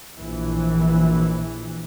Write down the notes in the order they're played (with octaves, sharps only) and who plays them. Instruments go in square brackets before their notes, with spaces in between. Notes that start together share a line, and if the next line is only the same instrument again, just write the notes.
[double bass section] A#1 E3